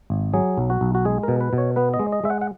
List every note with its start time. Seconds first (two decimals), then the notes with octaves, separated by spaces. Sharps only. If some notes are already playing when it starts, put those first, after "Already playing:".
0.10 G#1
0.33 F#3 G#4
0.58 B1
0.70 F#4
0.81 B1
0.95 F#4
1.05 G#3 G#4
1.23 B2 A#4
1.41 B4
1.53 B2
1.58 C#5
1.76 B3 B4
1.94 D#5
1.99 G#3
2.12 D#5
2.24 G#3 E5
2.30 F#5
2.41 F#5